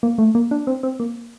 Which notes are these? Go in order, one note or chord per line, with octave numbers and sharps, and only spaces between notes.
A#3
A3
A#3
D4
C4
C4
A#3